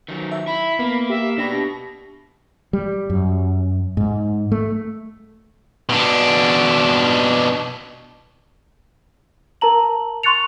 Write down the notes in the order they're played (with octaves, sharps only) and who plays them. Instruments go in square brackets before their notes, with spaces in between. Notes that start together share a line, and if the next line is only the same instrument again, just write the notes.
[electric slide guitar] D#3 F#3
[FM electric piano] E5
[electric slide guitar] E4 [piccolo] B5
[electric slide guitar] A#3 [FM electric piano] B3
[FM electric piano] G4 [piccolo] E5
[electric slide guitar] B2 [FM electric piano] D4 G4 B5 [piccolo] A#6
[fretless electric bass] G3
F#2
G#2
A3
[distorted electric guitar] B2 D4
[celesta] A#4 A5 A#5 F#7
C6 C#6 F#6 A6 C#7 F7